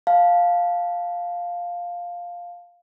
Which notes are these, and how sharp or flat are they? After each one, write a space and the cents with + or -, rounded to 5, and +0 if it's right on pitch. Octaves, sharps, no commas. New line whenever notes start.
F5 +5 A5 -10